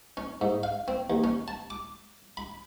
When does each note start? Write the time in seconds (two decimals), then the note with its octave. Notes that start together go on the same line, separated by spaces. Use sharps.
0.17 C#4
0.41 G#2
0.63 F5
0.88 C4
1.10 D#2
1.24 C#4
1.48 A5
1.70 D6
2.37 B5